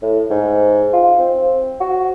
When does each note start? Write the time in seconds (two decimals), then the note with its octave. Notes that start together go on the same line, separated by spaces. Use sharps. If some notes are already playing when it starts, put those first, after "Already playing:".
0.02 A2
0.30 G#2
0.93 F4
1.19 C4
1.80 F#4